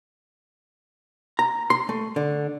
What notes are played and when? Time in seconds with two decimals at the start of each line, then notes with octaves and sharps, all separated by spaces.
1.39 A#5
1.70 C6
1.89 A3
2.16 D3